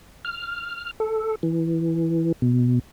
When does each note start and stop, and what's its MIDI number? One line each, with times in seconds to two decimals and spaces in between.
0.25 0.91 89
1.00 1.35 69
1.43 2.32 52
2.42 2.79 47